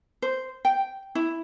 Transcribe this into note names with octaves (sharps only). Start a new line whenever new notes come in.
C5
G5
E4